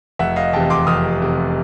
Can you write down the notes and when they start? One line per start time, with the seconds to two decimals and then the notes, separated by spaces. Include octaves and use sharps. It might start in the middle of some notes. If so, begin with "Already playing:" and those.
0.19 F1 E5 F#5
0.36 D#5 F5
0.53 E2 C3 G5 A5
0.70 C6 D6
0.87 F1 D#6 F6
1.20 E2 C3